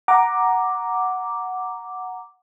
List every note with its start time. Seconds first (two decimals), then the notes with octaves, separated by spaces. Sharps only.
0.08 F#5 A#5 D6